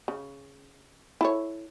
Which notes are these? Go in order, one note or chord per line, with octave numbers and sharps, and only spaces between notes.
C#3
E4 A4 C#5